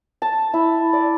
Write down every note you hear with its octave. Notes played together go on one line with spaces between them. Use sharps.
A5
E4
D5